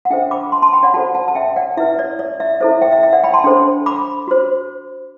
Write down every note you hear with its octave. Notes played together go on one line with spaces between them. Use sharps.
F#5
D4 A4 C5 E5 G5
B5 D6
A5 C6
A5 C6
G5 B5
D5 F#5
F#4 A4 C5 F#5 A5
F#5 A5
A5
E5 G5
D5 F#5
E4 B4 E5
D5
D5
E5
E4 A4 C5 E5
E5
E5 G5
E5
E5
D5 F#5
G5 B5
A5 C6
D4 A4 C5
B5 D6
F#4 C5